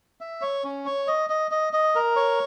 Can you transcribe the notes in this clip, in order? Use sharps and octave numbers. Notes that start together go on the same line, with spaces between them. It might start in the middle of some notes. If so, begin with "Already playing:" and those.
E5
C#5
C#4
C#5
D#5
D#5
D#5
D#5
A#4
C#5